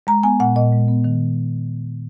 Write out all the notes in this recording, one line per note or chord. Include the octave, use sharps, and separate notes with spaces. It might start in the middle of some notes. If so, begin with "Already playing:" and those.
G#3 A#5
B3 G#5
A#2 F#5
A#2 D#5
G#3
B3
D#3